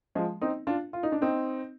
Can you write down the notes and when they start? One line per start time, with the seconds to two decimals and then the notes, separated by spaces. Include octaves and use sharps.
0.15 F3 G#3
0.41 C4 D#4
0.67 D4 F4
0.93 F4
1.03 D#4
1.12 D4
1.22 C4 D#4